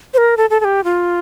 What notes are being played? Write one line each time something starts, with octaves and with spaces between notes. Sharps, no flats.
C5
A#4
A4
A4
A4
G4
F4